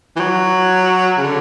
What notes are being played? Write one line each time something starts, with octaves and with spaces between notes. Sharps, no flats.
E3
F#3
C#3
D3